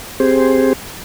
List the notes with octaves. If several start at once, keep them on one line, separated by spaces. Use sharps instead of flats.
C4 G4 G#4 C5